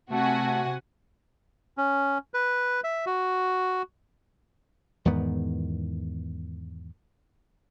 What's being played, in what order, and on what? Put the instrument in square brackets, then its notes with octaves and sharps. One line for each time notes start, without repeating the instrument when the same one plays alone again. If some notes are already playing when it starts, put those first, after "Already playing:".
[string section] C3 F#5 G#5 [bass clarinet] A3 [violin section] F#4
[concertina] C#4
B4
E5
F#4
[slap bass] E2 G#2 D#3 B3